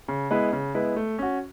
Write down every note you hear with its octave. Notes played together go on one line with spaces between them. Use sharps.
C#3
G#3 B3 E4 B4
C#3
G#3 B3 E4 B4
A3
C#4 F#4